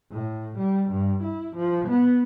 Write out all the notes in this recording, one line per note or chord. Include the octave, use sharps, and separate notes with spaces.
A2
G3
G2
E4
F3
B3